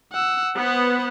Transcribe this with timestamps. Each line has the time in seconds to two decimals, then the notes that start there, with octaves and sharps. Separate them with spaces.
0.12 F#5 E6
0.56 B3 C5 F#5